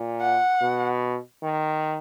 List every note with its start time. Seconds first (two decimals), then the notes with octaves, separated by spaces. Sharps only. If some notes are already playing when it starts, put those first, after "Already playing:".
Already playing: A#2
0.21 F#5
0.62 B2
1.43 D#3